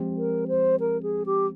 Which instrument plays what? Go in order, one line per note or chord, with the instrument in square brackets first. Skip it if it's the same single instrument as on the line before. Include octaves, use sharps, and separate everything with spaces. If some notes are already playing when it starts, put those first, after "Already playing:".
Already playing: [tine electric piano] F3 G#3 C4 G4
[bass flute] A#4
C5
A#4
G#4
G4